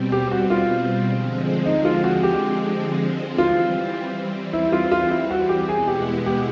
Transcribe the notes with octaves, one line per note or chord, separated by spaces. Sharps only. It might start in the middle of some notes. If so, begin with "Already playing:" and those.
Already playing: B2 G3 C4
G4
F#4
F4
D3 F3 G#3 C4
D#4
F4
F#4
G4
E3 G3 C4 F4
E4
F4
F4
E4
F#4
G4
E2 B2 G#3 B3 E4 G#4
G4
G4